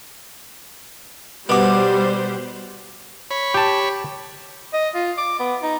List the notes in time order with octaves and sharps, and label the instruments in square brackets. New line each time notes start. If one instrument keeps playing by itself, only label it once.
[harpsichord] B2 B3 [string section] G3 C5 [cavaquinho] D5 D6 D#6
[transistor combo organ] C#5 B5
[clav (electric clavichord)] G4 A5
[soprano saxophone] D#5
F4
D6
B3
D#4